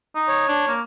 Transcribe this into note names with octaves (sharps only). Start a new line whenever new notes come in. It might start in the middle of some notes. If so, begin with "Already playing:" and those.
D#4
C#5
D4
A#3